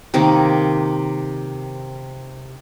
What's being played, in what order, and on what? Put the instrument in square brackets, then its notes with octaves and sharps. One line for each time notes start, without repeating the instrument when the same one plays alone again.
[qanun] C3 D#3 A#3